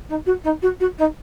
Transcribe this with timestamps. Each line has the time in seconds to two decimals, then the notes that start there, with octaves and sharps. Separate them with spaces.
0.09 D#4
0.26 F#4
0.44 D#4
0.62 F#4
0.80 F#4
0.98 D#4